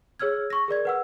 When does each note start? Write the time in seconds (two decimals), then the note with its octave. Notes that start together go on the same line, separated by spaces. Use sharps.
0.20 G#4 C#5 E6 F6 G#6
0.50 C#6 A#6
0.68 G#4 A#4 D5 G#6
0.85 B4 F#5 E6